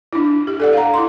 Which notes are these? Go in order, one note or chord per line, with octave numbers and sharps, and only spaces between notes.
D4 E4
G4
A4 D5 F#5
F5 A#5
E4 C6